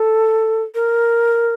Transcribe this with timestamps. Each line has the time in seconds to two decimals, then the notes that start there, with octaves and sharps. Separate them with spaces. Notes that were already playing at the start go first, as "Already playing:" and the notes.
Already playing: A4
0.75 A#4